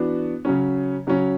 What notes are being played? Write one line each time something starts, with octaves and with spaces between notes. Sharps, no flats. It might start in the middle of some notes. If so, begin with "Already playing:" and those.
Already playing: E3 B3 D4 F#4
C#3 F#3 C#4
C#3 F#3 C#4